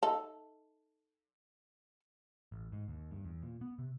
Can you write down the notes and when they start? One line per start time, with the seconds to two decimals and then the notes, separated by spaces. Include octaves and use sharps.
0.03 D#4 A4
2.52 A1
2.72 G#2
2.88 D#2
3.11 G2
3.24 E2
3.42 A#2
3.61 B3
3.79 C3